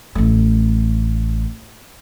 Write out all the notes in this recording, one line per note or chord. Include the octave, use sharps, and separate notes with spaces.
A1 A3